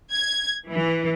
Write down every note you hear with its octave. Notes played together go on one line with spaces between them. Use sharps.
G#6
E3